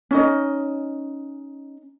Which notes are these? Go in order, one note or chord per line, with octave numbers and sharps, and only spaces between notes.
C#4 D#4 D#5